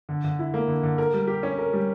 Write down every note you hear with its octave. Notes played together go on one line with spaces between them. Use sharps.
D3
D3
E4
A#3
D3
D3
A#4
G3
G4
C#4
A#4
G3